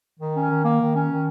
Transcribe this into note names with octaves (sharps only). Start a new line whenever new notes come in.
D#3
C#4
D#3
A#3
D#3
C#4
D#3